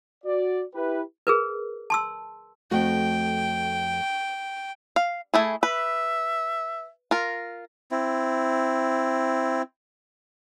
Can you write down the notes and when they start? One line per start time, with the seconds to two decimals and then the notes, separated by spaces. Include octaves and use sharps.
0.24 F#4 D5
0.74 E4 G4 B4
1.27 G#4 A#4 B4
1.90 A5 C6 E6
2.71 F2 A3 F#4 G5
4.96 F5
5.34 A3 E4 G#4
5.63 B4 E5
7.11 F4 A#4
7.91 C4 E4